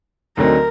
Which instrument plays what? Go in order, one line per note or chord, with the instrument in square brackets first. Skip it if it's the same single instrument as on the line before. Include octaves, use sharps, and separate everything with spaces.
[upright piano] D2 D3 F#3 C4 D#4 [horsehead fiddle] A#4